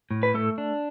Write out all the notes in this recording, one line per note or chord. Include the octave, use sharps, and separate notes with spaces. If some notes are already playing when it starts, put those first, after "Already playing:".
A2
B4
A3 A4
D4